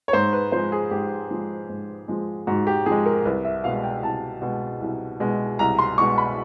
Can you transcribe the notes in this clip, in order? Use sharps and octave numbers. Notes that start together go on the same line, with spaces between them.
C#5
G#2 C5
B4
F3 G#3 C5
G#4
G#2 G4
F3 G#3
G#2
F3 G#3
G#2 F#4
G4
F3 G#3 G#4
A#4
C2 B4
E5
B2 G#3 F5
G5
C2 A5
B2 G#3
C2
B2 G#3
C2 A#5
C6
B2 G#3 C#6
B5